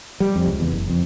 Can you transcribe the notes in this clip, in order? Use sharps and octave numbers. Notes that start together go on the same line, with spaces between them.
G3
F2
C#2
E2
F#1
F2